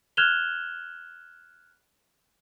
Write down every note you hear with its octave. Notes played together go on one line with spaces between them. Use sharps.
F6 F#6 G#6 E7 F7 G7